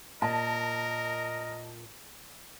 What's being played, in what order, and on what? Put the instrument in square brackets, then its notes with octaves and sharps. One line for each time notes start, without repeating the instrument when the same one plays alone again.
[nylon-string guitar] A#2 [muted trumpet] A#4 [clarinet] D#5 [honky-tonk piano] A5